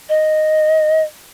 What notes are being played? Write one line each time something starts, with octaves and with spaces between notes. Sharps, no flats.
D#5